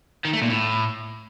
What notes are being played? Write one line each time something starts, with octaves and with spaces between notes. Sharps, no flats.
D#3
A3
A#2
A2